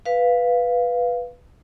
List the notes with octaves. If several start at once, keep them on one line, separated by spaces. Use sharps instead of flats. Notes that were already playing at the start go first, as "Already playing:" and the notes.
B4 F5